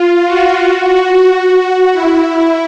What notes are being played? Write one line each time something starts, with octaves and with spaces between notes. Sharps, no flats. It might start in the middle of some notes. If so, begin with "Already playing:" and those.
Already playing: F4
F#4
F#4
F#4
F#4
E4